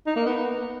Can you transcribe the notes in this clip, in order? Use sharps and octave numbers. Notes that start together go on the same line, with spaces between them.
D#4
A#3
B3